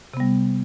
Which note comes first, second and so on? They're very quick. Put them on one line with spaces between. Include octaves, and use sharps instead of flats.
C3 B3 G3